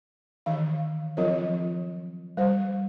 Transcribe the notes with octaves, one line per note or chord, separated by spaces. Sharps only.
D#3 E3 F5
F3 F#3 C4 F4 A#4 C#5
G3 C5